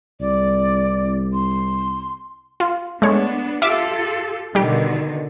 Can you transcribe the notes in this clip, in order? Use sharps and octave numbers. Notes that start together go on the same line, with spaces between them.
C2 D5
C6
F4
G#3 A3 B3 D4 C#5
F4 G4 A4 E5 F5 D6
B2 D3 D#3 G3 G4